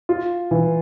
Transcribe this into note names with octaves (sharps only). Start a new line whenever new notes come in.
F4
E3